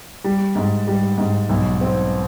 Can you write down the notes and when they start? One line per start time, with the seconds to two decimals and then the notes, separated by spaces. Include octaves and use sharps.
0.24 G3
0.56 G#2
0.88 G3
1.18 G#2
1.49 B1
1.81 C4